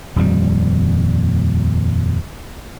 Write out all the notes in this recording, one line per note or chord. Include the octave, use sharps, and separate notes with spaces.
D#1 F2 G3